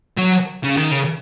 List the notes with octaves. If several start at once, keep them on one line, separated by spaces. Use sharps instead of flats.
F#3
C#3
D#3
C#3